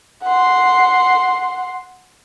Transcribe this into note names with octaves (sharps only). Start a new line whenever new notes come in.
F#5 C6